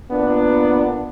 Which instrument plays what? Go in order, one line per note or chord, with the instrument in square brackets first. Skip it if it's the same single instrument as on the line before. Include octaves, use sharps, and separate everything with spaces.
[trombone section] A#2 B3 D4